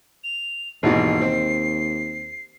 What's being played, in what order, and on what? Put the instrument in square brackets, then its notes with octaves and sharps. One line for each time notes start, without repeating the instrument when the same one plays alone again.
[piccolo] F7
[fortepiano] G#1 B2 E3 [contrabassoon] D#2 [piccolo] C7
[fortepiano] C4